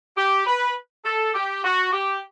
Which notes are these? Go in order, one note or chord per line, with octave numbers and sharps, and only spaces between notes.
G4
B4
A4
G4
F#4
G4